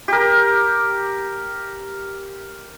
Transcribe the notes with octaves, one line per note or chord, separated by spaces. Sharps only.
G4 A#4